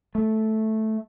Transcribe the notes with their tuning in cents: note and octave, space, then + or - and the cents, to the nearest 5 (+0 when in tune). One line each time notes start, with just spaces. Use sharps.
A3 -5